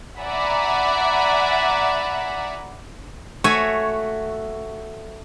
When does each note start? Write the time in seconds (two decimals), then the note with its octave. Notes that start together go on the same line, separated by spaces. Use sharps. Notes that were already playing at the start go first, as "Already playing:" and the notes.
0.19 D5 E5 F#5 G#5 A#5 B5
3.44 A3 F#4 C#5 E5 G#5